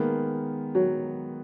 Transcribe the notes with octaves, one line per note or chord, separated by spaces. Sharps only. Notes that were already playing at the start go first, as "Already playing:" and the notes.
Already playing: D#3 G#3 A#3 B3
F#3